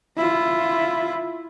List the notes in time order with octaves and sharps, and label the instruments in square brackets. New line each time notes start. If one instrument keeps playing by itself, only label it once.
[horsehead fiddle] E4 F4